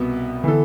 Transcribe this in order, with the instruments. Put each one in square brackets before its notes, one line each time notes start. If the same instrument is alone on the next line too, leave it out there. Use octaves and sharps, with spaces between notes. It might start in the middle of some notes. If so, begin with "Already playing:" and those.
Already playing: [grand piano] C2 B2 B3
[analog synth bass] D3 [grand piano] E3 B3 E4 A4